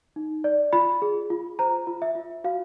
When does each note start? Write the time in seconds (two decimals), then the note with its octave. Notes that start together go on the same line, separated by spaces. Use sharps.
0.16 D#4
0.44 D5
0.73 F4 B5
1.02 G#4
1.30 F4
1.59 C5 A#5
1.87 F4
2.02 E5
2.15 F4
2.44 F#4 F5